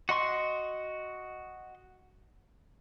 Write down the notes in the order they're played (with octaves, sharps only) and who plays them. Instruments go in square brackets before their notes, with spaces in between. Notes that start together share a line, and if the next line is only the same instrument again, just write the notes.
[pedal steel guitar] F#4 D#5 C6 C#6